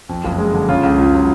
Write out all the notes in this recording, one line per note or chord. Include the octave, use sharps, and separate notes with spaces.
F2
F#1
G#3
D3
C#3 F4
C#2
C#2
F#3